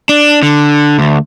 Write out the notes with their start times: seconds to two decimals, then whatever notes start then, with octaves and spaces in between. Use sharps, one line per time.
0.09 D4
0.43 D3
0.99 D2